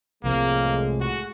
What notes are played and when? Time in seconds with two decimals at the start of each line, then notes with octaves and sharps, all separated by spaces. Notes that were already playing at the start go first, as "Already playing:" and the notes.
0.24 C2 A2 F3 G#3 A#3 C4
1.00 F#4